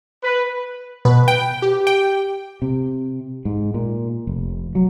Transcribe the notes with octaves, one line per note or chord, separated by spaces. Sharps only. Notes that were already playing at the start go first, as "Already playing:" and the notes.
B4
B2 B4
G5
G4
G5
C3
G#2
A#2
F1
F#3